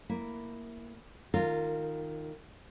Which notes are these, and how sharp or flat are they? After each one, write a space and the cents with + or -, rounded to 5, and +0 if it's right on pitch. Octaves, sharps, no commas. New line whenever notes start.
A#3 +0 E4 +0
D#3 +0 F4 +0 A#4 -25